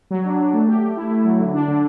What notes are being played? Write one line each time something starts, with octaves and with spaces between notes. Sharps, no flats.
F#3
D4
D4
A3
G4
A3
E4
A3
F#3
D3
D4
D3